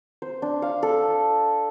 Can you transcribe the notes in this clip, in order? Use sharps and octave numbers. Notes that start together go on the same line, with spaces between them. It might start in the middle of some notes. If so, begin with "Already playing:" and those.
C5
D4
F5
A4